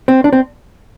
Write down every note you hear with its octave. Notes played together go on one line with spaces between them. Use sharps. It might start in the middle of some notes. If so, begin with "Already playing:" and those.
C4
D4
C4